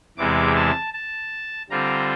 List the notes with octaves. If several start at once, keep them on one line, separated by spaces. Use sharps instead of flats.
E2 C3 E3 G#3 D6
A5
A5
D3 G3 C4 F4 A#5